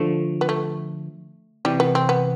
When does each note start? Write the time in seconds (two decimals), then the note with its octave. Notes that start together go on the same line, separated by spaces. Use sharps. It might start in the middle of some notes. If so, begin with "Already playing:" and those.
Already playing: D3 F3 A3
0.41 B3
0.49 A3
1.65 C3 E3 G3
1.80 B3
1.95 C4
2.09 B3